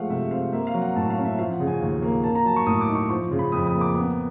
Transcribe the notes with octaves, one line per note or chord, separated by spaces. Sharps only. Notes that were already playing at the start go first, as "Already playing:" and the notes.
Already playing: F3 G#3 A3 F5 F#5
C3 E5
C4 F5
A#3 E5
F5
F#3
F#5
A2 A5
F5
C#4
E5
F3 F5
F#5
C#3
G#5
D#2
A#3
A#3 A5
A#5
F#3 A5
C#6
A2 D#6
D6
D#4
C#6
F3 C#6
C#3
B5
F2 D#6
D#6
A#3
D6
B3